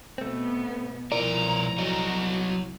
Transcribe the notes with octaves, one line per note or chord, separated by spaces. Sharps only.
B2 A3 B3 C4
C2 B2 F3 E4 A#4 D5 A#5
F#3 F#4 C#5 D#5